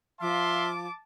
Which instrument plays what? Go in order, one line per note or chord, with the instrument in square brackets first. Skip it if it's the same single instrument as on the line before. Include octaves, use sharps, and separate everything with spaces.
[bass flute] F3 [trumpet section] E5 F5 C6 [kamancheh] A5 D6